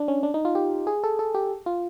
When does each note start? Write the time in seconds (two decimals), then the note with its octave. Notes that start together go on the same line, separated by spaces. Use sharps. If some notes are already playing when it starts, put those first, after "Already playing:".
Already playing: D4
0.08 C#4
0.23 D4
0.34 D#4
0.45 F4
0.55 G4
0.87 G#4
1.04 A4
1.19 A4
1.35 G4
1.66 F4